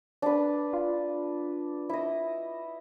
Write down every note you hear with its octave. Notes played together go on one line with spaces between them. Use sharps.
D4 B4
F4
E4 D#5